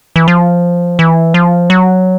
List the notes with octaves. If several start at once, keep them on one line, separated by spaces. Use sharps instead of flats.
E3
F3
E3
F3
F#3